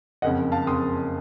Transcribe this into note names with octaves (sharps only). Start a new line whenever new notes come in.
F#1 F2 C#3 D#5 F#5
F5 A5
F#1 F2 C#3 C6 D#6